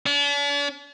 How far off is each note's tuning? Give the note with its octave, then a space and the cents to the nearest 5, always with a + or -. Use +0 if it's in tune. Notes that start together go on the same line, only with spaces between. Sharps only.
D4 -45